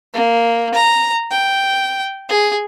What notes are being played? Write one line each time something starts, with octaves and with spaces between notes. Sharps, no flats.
A#3
A#5
G5
G#4